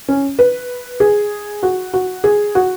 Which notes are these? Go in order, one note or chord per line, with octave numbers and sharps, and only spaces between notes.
C#4
B4
G#4
F#4
F#4
G#4
F#4